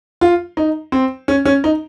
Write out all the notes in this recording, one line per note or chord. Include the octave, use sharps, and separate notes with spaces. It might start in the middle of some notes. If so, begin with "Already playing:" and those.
F4
D#4
C4
C#4
C#4
D#4